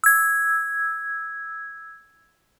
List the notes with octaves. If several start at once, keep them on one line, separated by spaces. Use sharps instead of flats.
E6 G#6